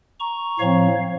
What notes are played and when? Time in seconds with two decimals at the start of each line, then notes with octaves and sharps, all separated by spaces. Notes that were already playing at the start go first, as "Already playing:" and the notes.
0.19 A#5 C#6
0.59 A2 F3 C4 C#5 F5